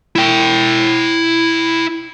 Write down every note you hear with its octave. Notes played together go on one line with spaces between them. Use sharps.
E4 G5